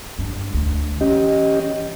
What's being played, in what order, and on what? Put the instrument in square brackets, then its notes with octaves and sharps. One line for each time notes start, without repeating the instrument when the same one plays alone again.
[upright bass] G2
D2 D3
[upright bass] E3 [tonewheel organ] C#4 G4 D#5